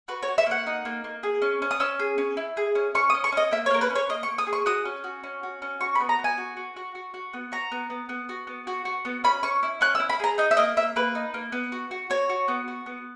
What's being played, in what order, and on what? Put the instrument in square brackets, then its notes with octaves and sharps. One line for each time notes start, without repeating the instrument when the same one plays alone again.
[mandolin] F#4 B4
C#5
F#4
E5
A#3 F#5
D#4
A#3
A#3
G#4
C#4
C#4
D#6
C#4 E6
G#4
C#4
E4
G#4
C#4
C#4 C#6
D#6
C#4
C#6
C#4 D#5
A#3 E5
C#5
A#3 A#4
B4
C#4
C#5
A#3 D#5
C#6
A#3
D#6
G#4
C#6
F#4 D#6
C#4
F#4
C#4
F#4
C#4
F#4 C#6
B5
B3
A#5
B3
G#5
F#4
F#4
F#4
F#4
F#4
B3
F#4 A#5
B3
B3
B3
F#4
B3
F#4
F#4
B3
C#4 B5
C#4 C#6
E4
C#4 F#6
E6
E4
B5
G#4 A#5
D#4 D#5
E5
A#3 D#5
A#3 E5
A#3 B4
D#4
A#3
B3
F#4
F#4
F#4 C#5
F#4
B3
F#4
B3